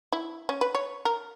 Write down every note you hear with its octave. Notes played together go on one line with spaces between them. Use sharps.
E4
C#4
B4
C#5
A#4